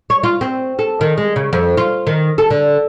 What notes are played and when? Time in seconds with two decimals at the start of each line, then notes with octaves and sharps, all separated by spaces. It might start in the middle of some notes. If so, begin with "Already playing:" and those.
0.10 C#5
0.23 F4
0.41 C4
0.79 A4
1.01 D#3
1.18 G#3
1.36 C#3
1.53 F2
1.77 F4
2.07 D#3
2.38 A4
2.51 D3